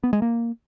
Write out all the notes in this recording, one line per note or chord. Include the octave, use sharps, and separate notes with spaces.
B3
G#3
A#3